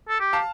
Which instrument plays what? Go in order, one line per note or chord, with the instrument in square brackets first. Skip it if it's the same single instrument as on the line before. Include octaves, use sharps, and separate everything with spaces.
[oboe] A4
G4
[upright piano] F5 A5